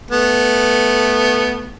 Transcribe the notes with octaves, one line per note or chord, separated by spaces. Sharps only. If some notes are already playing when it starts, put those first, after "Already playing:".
A3 B3